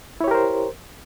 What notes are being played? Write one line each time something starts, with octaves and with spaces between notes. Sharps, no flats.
E4 G4 A#4 C5 C#5